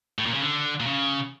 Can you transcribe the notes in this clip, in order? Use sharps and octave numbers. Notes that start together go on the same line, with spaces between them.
A2
A#2
C#3
D3
A#2
C#3